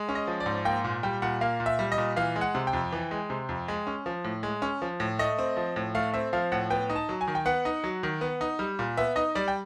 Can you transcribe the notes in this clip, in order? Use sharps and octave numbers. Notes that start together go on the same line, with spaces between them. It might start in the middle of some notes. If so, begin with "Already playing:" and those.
Already playing: G#3
C#4
D#5
F3
D5
G#2
A#3 G5
A#2
G3 G5
A#2 F#5
A#3 F5
A#2
E5
G3
D#5
A#2
E3 F5
G#3
F#5
C3
G5
F2
E3
G#3
C3
F2
G#3
C#4
F3
A2
G#3
C#4
F3
A2
A3 D#5
C4
F3
A2
A3 F5
C4 E5
F3 F5
A2 F#5
B3 G5
D#4
A5
F#3
G#5
D#3
G5
B3 F#5
D#4
F#3
D#3
B3
D#4
G3
A#2
B3 E5
D#4 D#5
G3 D5
G5